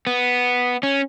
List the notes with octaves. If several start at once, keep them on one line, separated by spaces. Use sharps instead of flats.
B3
C#4